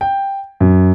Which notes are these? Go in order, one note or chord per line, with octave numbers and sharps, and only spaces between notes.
G5
F#2